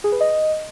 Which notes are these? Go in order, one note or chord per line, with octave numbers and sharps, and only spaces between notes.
G#4
B4
D#5